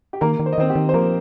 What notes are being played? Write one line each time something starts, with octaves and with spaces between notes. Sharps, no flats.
G4
D#3 A#3 A#4
D#3
C5
D#5
D#3 C4 C5
G4
D#3
C5
F3 A#3 A#4